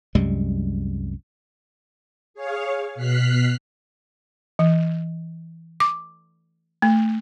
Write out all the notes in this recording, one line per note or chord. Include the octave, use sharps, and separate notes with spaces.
C2 F#2 G3 G#3
G#4 C#5 F5
B2 F6 F#6 B6 C7
E3
D6
A3